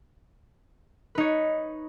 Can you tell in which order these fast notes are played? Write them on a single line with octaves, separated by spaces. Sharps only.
B4 D#4 C#5